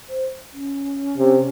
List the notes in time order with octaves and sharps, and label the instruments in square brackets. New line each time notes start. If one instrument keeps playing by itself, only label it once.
[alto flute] C5
C#4
[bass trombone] C3